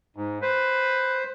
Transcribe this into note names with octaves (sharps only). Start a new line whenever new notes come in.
G#2
B4 C5